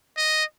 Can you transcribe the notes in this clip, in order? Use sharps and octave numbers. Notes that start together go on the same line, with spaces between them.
D#5